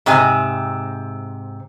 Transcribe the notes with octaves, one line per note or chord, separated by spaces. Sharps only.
G#2 C3 C4 G#5